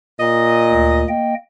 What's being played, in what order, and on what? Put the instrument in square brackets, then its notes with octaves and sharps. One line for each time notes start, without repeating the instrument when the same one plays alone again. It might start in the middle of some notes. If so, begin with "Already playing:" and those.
[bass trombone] A#2 [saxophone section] D#5
[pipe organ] D2
A#3 D#5 G5